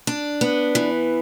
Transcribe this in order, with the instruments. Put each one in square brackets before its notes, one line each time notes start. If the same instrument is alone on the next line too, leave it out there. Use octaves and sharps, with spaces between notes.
[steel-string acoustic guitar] D4
B3
E3